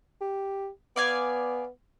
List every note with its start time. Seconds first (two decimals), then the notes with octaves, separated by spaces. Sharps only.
0.21 G4
0.96 B3 D5 F5 G#5